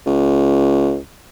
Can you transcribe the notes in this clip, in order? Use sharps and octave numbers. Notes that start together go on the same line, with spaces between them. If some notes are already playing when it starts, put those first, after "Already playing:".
C#2